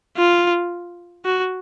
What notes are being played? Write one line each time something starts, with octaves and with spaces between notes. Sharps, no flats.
F4
F#4